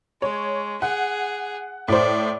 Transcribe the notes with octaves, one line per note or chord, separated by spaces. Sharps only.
G#3 C#5
G#4 F#5
A2 C5 D5